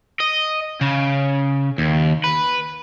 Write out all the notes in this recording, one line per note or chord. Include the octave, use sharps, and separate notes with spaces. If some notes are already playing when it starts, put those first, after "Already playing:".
D#5
C#3
D#2
B4